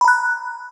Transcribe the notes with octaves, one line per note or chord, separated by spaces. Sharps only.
A#5 B5 F#6